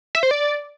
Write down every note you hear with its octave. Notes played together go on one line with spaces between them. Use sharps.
E5
C5
D5